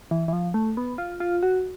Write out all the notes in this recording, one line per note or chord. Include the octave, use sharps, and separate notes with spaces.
E3
E3
F3
A3
B3
F4
F4
F#4